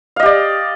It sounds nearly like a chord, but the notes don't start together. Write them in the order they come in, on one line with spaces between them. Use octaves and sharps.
F5 D#5 G4 D5